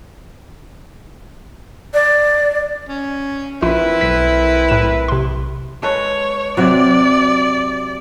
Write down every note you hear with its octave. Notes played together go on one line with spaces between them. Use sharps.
D5
C#4
A#1 C4 E4 F4 A#4 B4
B1 B6
A2 E7
C3 C6
G#3 A4 B4 C#5
C3 F#3 D5